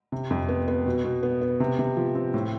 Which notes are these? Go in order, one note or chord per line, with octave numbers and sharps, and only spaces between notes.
C3
F2
B3
B3
B2
B2
B3
B3
C3
C3
F3
C4
A2